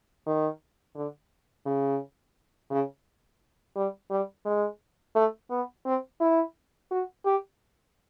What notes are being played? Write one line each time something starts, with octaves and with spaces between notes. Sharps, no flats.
D#3
D3
C#3
C#3
G3
G3
G#3
A3
B3
C4
E4
F#4
G4